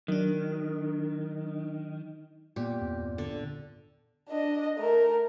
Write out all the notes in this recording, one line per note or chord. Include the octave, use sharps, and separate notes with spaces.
D#3 F#3 D4
A#2 B3 G4
E2 G2 C4
D3 D5
D4 D#5
A3 A#4